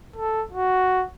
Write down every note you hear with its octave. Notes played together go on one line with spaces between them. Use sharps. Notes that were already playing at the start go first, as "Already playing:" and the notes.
A4
F#4